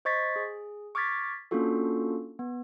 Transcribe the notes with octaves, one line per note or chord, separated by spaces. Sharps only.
C5 D#5 C#6 G#6 A6 B6
G#4
C#6 D6 F6 G#6 A6 B6
A#3 C#4 D4 F4 F#4 A4
B3